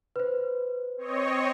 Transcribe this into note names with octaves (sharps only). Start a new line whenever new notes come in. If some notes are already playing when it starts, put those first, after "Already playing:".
B4 C5
C4 C#5 D#5